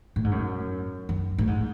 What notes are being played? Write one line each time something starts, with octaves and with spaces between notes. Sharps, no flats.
A2
G#2
F#2
F#2
A2
G#2